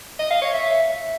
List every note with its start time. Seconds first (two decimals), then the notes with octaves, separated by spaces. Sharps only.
0.19 D#5
0.30 F5
0.42 C#5
0.53 E5